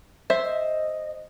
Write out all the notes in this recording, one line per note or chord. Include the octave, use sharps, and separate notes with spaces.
C5 E5
D#5